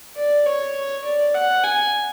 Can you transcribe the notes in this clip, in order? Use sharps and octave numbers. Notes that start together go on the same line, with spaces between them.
D5
C#5
D5
F#5
G#5